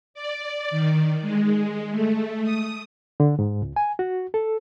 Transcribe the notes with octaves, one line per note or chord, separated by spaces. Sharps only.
D5
D#3
G#3
A3
D#6
D3
G#2
C#2
G#5
F#4
A4